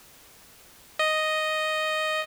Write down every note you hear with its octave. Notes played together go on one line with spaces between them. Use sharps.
D#5